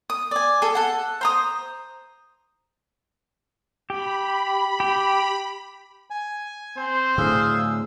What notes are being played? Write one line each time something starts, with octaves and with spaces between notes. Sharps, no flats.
D#6
D5 G#5
G#4 A4
A4 F#5
C5 A#5 D#6
G4 B5
G4
G#5
C4 C5
A2 D3 A3 G#4 F5 E6